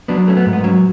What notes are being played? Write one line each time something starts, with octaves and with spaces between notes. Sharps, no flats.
F#3 B3 D4
A3 C#4
B3
G#2
B3
F#3 C#4